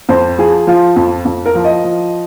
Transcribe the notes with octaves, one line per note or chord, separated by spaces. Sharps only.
F2 C5
F3 G#4
F3 F4
F2
F2
A#4
F3
D#5
F3